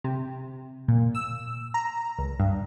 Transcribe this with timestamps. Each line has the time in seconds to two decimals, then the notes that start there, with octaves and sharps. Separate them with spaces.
0.04 C3
0.88 A#2
1.15 E6
1.74 A#5
2.19 C#2
2.40 G2